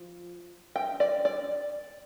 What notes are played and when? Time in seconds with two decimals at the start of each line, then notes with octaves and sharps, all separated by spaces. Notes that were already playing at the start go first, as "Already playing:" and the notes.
Already playing: F3
0.76 G5
1.00 D5
1.25 D5